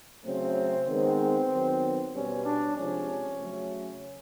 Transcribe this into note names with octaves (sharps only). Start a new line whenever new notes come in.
C#3 F#3 A3 C4
D#3 G#3 B3 C4
D#3 F#3 B3
B2 G3 B3 C#4
D4
C3 F3 G#3 C#4
C#3 F#3 A3